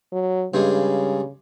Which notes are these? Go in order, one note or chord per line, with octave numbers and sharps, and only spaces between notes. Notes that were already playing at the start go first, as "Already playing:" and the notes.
F#3
G2 C#3 G#3